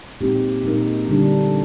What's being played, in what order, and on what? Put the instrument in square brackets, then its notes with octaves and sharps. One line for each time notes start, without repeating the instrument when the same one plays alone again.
[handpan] A#2 G#3 C4 D#4 G4
A#2 G#3 D#4 A#4
D3 G3 D4